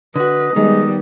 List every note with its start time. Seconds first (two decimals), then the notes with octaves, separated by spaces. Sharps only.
0.16 D3 F#4 B4 D#5
0.56 D#3 G3 G#3 B3